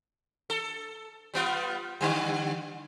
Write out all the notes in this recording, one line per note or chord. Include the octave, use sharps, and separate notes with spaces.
A4
G3 B3 F4
D3 G3